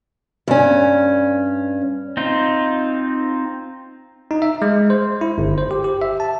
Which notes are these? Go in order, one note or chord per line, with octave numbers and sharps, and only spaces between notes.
G2 C#4
C4 D#4 F4
D#4
E5
G#3
C5
E4
G1
C5
G4
G4
E5
A5